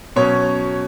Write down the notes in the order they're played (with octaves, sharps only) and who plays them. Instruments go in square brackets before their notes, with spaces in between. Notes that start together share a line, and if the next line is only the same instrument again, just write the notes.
[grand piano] B2 F#3 C#4 C#5